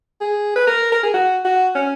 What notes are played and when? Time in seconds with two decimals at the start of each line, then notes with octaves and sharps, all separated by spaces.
0.21 G#4
0.56 B4
0.67 A#4
0.92 A#4
1.03 G#4
1.14 F#4
1.45 F#4
1.75 C#4